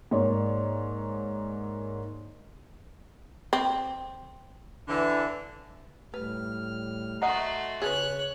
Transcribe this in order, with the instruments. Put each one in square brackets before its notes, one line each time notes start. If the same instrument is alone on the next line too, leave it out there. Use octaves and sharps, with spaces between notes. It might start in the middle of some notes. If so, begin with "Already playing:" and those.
[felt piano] G#2 A#3 C#5 D5
[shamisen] C4
[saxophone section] D3 E3
[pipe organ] A2 G3 F6 [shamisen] B4
[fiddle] A3 F#4 [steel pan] D#5 F#5 A#5 [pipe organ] C6
[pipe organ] C#3 [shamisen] G#4 A4 B4 [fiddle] C#5 F#6